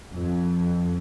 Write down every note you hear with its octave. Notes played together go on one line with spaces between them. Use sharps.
F2